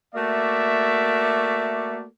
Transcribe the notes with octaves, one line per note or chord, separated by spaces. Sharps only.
A3 A#3 F#4 D5 E5